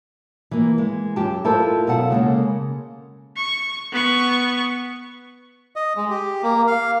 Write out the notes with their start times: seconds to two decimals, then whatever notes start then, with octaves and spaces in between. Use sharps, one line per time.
0.51 E3 A#3
0.78 G#3
1.16 F#2 G4 A5
1.44 E4 F4 A4 A#4 C5
1.87 F#2 B2 A4 F5 F#5 A5
2.10 C#3 G#3 A#3 A4
3.36 C#6
3.92 B3 C#6
5.76 D#5
5.96 G#3
6.10 G4
6.43 A#3
6.67 F5